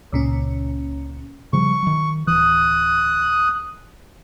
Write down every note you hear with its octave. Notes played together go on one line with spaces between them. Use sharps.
C#2 A#2 C#4
C#3 F3 G3 C#6
D#3 F#3
D1 E3 D#6 F#6